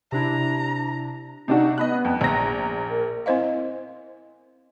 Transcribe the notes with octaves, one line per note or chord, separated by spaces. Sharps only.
C3 D4 E4 A#5
C3 D4 D#4 F#4
B3 D#5 B5 F#6
F2
A#1 A#5 A#6
A#4
C4 E4 C5 D#5 F5